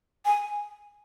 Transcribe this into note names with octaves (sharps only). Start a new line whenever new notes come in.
G#5